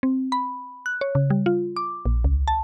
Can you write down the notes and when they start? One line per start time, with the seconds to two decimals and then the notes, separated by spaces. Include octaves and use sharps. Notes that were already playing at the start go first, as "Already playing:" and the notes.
0.03 C4
0.32 B5
0.86 F#6
1.01 C#5
1.15 C#3
1.30 G3
1.46 F4
1.76 D6
2.06 A#1
2.24 C#2
2.48 A5